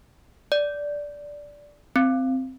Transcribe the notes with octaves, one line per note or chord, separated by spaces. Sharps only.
D5
C4